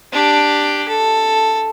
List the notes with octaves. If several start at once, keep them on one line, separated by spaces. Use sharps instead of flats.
D4 G4
A4